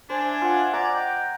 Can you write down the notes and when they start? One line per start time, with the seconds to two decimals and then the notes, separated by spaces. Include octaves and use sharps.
0.09 D4 C5 E5 G#5 G#6
0.41 F4 F#5
0.73 D5 F#5 A#5
0.94 D#5 G5